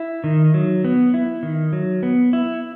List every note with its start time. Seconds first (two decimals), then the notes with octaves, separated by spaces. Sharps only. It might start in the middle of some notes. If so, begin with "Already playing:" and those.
Already playing: E4
0.24 D#3
0.54 F#3
0.84 B3
1.14 E4
1.43 D#3
1.73 F#3
2.03 B3
2.33 E4